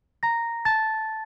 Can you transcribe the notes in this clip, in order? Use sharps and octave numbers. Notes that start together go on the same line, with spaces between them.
A#5 A#6
A5 A6